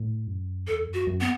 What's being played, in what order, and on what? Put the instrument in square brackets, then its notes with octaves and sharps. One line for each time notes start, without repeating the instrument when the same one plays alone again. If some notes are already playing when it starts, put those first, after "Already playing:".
Already playing: [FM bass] A2
F#2
[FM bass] E2 [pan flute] A4
[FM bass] F#2
[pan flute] F#4
[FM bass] F#2
[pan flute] B3